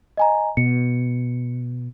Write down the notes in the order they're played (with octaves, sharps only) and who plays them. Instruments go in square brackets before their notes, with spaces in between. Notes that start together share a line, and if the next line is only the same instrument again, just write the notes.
[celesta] D#5 G#5 A#5
[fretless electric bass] B2 [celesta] C#7